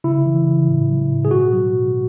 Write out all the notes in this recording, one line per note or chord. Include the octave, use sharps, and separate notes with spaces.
C#3 E4
E3
C#3
A2
F#3
A2
G#4
B2 F#4
F#3
B2